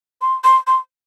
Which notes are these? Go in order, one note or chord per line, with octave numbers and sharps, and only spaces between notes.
C6
C6
C6